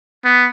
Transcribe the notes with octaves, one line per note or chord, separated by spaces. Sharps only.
B3